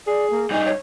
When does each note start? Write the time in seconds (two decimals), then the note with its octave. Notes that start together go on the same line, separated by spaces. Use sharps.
0.07 G#4 D5
0.30 A#3
0.51 G2 D#4 G#5
0.65 C#5